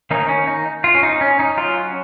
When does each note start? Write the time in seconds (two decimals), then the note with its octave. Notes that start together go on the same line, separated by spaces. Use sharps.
0.11 D#3 A#3 C#4 D#4
0.29 C#4
0.47 D#4
0.84 F4
0.95 C#4
1.03 D#4
1.21 C#4
1.39 D#4
1.57 F#3 C#4 F4